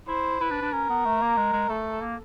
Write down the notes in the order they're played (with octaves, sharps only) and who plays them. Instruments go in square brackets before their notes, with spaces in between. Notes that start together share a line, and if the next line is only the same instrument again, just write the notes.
[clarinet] E4 [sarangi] C5
[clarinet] E4 [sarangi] B4
[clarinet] D4
D4
[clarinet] C#4 [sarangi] A#4
[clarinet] B3
A3
A#3
G#3
G#3
[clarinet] A3 [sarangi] A4
[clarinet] A#3